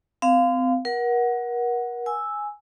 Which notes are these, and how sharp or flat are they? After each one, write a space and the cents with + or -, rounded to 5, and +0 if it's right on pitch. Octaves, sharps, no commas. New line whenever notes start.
C4 -35 F5 +0
A#4 +35 F#5 +0
G#5 +0 E6 -5